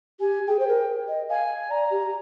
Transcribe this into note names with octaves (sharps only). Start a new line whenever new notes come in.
G4 G#5
G#4 G5
C5
A#4
D#5
F5 G#5
D5 A#5
G4